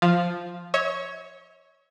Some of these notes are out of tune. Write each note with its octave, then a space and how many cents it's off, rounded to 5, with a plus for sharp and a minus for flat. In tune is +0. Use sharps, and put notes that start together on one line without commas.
F3 +0 F5 +0
C#5 +0 E5 -45